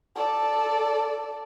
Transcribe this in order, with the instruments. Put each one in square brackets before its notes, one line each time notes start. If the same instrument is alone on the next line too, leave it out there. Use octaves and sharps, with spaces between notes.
[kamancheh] A4 D5